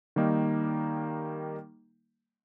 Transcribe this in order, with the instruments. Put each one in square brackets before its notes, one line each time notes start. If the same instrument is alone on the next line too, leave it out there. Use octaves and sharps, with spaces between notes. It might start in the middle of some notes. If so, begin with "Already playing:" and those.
[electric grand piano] D#3 G3 A#3 D#4